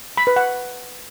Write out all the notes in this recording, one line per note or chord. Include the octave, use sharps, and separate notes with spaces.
B5
B4
F#5